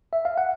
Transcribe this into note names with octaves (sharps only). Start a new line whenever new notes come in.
E5
F5
F#5